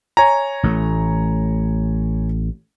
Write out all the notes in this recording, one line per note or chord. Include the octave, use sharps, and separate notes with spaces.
C#5 G#5 A#5
A1 A3